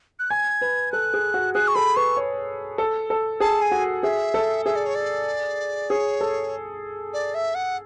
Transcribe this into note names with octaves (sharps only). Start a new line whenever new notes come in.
F#6
G#5 G#6
B4
A4 F#6
G#4
F#4
G#4 F#6
C#6
A4 B5
B4 C#6
C#5
A4
A4
G#4 A5
G#5
F#4
G#4 E5
A4
G#4 E5
D5
C#5
D5
G#4 C#5
A4
D5
E5
F#5